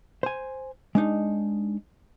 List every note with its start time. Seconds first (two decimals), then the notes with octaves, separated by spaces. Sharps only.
0.23 C5 G#5
0.95 G#3 D4 D#4